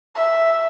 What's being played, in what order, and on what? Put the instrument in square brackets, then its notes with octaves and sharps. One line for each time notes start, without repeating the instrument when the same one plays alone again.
[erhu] E5